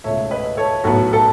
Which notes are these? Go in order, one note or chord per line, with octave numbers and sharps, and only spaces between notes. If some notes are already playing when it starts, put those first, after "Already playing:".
C#2 B2 A3 C#5 E5
B4 D#5
A4 C#5
B1 A2 F#3 B3 F#4 A4
A4